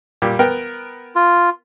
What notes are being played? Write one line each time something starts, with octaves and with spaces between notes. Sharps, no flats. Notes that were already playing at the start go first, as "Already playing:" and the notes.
A#2 G3
B3 A#4 G5
F4